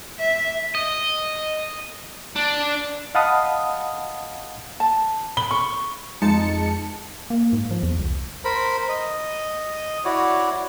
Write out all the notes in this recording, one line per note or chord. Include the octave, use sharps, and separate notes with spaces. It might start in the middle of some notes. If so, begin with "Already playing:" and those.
E5
D#5
D4
D#5 F5 F#5 A5 B5 D#6
A5
B5 G7
C#6
F2 G#3 D#4 A5 C#7
A#3
G#2
F3
E2
C2
A#4 C5 B5
D#5
E4 F#4 C#5 D5